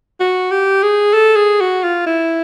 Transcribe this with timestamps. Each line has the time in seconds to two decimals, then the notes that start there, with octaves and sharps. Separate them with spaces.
0.20 F#4
0.51 G4
0.83 G#4
1.13 A4
1.36 G#4
1.60 F#4
1.84 F4
2.06 E4